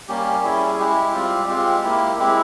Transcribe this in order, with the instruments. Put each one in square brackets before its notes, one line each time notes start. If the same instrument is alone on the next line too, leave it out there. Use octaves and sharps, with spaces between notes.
[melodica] G3 A#3 C#4 G4
G3 C#4 E4 G#4
G#3 E4 G4
G3 C4 F4
G#3 C4 F4 G4
A#3 E4
G#3 C4 E4 G4